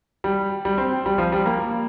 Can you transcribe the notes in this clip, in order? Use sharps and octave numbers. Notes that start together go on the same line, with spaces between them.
G3
G3
C4
G3
F3
G3
A#3